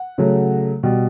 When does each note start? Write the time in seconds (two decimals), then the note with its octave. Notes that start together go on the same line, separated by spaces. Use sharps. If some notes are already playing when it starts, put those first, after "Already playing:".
Already playing: F#5
0.18 C#3 F#3 A3
0.83 B2 G3